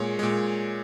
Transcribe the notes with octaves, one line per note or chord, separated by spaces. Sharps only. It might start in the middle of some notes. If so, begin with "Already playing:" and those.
Already playing: A#2 G#3 C#5
A#2 G#3